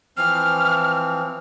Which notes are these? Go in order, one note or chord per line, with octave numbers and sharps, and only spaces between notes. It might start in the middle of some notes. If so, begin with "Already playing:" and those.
E3 F3 C4 F6